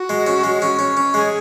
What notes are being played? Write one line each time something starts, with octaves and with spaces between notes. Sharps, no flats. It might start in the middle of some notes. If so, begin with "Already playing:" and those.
Already playing: F#4
G#3
C#4
G#3
C#4
C#4
C#4
G#3 G#4